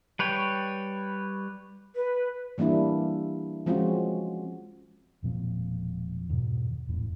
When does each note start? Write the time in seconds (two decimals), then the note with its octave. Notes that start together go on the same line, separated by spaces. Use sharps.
0.19 G3 B4 C#5 G5
1.95 B4
2.58 E3 G3 A#3 D4 E4
3.66 F3 G#3 C4 C#4 F4 F#4
5.23 E1 A#2 F3 C4
6.29 E2 G#2 B2 D#3
6.89 E1 E2 A2